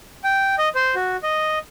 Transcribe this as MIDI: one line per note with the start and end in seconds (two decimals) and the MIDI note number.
0.24 0.55 79
0.58 0.69 75
0.75 0.95 72
0.95 1.17 66
1.23 1.59 75